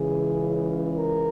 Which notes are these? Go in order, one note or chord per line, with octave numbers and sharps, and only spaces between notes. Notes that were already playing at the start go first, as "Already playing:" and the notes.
Already playing: C#2 C#3 E3 G#4
A#4